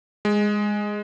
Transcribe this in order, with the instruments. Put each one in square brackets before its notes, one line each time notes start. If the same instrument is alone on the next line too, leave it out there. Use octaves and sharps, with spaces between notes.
[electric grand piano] G#3